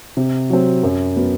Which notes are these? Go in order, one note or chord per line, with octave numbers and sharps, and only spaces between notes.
C3
F#3 C4
F#2
F#3 B3